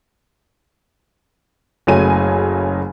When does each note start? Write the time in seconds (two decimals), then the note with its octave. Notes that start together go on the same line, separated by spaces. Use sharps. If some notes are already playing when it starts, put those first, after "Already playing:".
1.87 F#1 C#3 F#3 A3 G#5 D#7